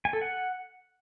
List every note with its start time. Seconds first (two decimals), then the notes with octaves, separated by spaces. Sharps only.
0.05 G#5
0.13 A4
0.21 F#5